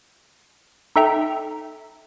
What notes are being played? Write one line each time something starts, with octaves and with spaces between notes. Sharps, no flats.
D#4 A4 E5 G5 A#5